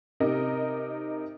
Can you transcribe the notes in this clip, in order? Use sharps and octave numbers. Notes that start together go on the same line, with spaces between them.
C3 D#4 A#4 D#5